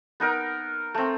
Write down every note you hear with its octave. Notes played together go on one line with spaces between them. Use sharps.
B3 D#4 A#4
A3 C4